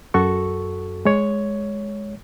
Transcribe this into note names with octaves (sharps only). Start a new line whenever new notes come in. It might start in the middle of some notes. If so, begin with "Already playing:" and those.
F#2 F#4 A4 C#6
G#3 C#5